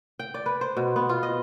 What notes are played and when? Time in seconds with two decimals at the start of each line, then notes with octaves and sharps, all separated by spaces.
0.19 G5
0.34 D5
0.46 B4
0.61 C5
0.77 B2
0.96 B3
1.09 F4
1.23 D#5